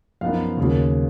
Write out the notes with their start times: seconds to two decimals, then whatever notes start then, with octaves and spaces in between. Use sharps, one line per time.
0.21 F#2 F3 B3 D#4 F5
0.57 D#2 C#3 F#3